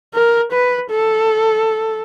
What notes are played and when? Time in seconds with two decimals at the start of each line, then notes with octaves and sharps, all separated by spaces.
0.14 A#4
0.52 B4
0.90 A4